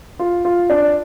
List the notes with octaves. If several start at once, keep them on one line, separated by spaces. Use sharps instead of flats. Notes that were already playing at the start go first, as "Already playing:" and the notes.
F4
F4
D4